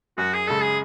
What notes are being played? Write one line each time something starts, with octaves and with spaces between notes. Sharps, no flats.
F#2 F#4
G#4
C#3 G#3 A4
G#4